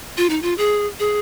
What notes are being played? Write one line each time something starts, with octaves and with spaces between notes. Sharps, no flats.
F4
D#4
F4
G#4
G#4